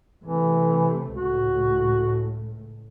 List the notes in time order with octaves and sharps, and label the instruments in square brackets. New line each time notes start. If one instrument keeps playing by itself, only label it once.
[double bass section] C3 A3 [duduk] E3
[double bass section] C#2 A2 [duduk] F#4